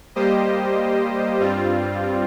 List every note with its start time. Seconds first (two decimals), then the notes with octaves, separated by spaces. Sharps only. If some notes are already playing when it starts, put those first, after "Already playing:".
0.15 G3 A#3 G4 C5 D#5
1.40 G2 G3 C4 F4